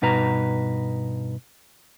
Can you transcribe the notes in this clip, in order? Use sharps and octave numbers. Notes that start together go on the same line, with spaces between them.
G2 B2 D#4 B4 A#5